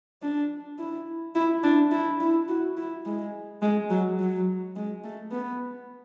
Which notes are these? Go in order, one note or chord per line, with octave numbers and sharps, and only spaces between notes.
D4
E4
E4
D4
E4
E4
F#4
E4
G#3
G#3
F#3
F#3
G#3
A3
B3